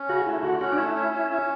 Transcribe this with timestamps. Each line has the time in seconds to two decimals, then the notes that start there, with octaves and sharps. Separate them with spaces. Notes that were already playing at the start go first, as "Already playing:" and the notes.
Already playing: C#4
0.09 C#3 F#4
0.26 A3 E4
0.43 D3 F#4
0.61 C#4 F#4
0.72 D4
0.78 A3 E4
0.96 C#4
1.13 C#4
1.30 C#4